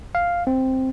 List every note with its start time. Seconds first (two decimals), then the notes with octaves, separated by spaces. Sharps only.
0.15 F5
0.47 C4